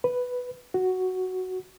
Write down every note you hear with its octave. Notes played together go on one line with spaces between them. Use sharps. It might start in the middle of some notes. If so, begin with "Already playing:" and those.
B4
F#4